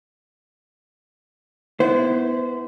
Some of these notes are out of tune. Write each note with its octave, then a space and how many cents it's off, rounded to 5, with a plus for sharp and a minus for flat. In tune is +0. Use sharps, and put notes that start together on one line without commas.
B3 +0 E4 -20 C5 -25